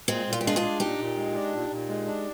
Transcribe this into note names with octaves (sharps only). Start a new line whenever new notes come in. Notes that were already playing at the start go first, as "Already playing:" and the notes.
A#2 G#3 C4
A#2
F4
G4
G#3 D4 F4
F4 G#4
D4
A#2 D#4 G4
A#2
G#3
D4
A#2
A#2
G#3
D4